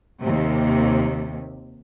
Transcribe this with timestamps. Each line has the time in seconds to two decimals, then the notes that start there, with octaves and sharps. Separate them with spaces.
0.20 D#2 C3